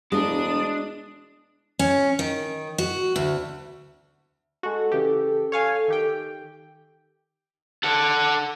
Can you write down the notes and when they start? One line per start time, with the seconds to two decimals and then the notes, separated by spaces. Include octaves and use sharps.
0.12 E1 G#3 D4 D#6
1.79 C#4
2.19 D#3
2.78 F#4
3.16 D2
4.63 G#3 F#4 A4
4.91 C#3 E3 G4
5.52 C#5 F5 G#5
5.88 D#3 G4 G5
7.84 A4 F#5